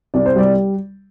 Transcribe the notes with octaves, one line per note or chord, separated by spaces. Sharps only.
C2 D5
C5
G3 D5